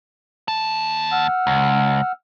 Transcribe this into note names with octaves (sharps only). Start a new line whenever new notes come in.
D#2 A5
F#5 E6 F6
C#2